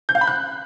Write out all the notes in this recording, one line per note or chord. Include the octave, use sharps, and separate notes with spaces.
G6
F5
B5
F#6